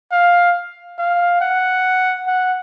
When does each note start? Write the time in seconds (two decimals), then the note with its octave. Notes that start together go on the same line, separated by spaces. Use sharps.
0.12 F5
0.98 F5
1.41 F#5
2.27 F#5